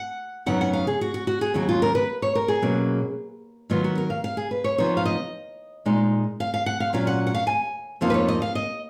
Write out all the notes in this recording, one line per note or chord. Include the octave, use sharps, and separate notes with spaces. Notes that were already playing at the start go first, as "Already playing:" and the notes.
Already playing: F#5
F#2 C#3 F#3 B3 D#4 F#5
F#5
F5
G#4
F#4
F#4
F#4
G#4
D#2 C#3 F#3 F#4
F4
A#4
B4
C#5
A#4
G#4
B2 F#3 A#3 C#4
D#3 F#3 B3 D#4 F4
F#4
A#4
F5
F5
G#4
B4
C#5
C#3 F3 B3 D#4 C#5
F5
D#5
A#2 G#3 D#4
F5
F5
F#5
F5
A#2 F#3 C#4 F4 F5
F#5
F#5
F5
G#5
F2 F3 A#3 D#4 F5
B4
C#5
D#5
F5
D#5